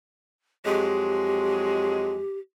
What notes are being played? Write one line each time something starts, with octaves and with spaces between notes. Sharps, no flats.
F2 F#3 G#3 G4